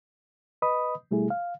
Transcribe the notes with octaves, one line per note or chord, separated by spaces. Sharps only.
B4 D#5 B5 D#6
B2 G3 A3 E4 G#4
F5